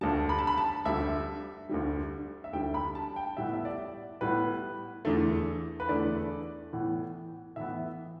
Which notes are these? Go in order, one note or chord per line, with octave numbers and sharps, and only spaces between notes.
D2 D3 G3 A5
B5
A5
B5
A5
D2 D3 G3 E5
D2 D3 G3
E5
D2 D3 G3 G5
B5
A5
G5
A2 G3 B3 E5
E5
D5
A2 G3 B3 B4
E2 D3 A3
B4
E2 D3 A3 D5
A2 E3 B3
A2 E3 B3 E5